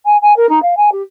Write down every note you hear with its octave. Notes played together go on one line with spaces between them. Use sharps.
G#5
G#5
A#4
D#4
F5
G#5
G4